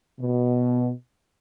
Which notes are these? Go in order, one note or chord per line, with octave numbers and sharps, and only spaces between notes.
B2